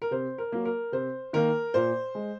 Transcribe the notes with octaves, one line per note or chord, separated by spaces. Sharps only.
A#4
C3 C5
A#4
F#3 A#3
A#4
C3 C5
D#3 A#3 A#4
A#2 C5
G#3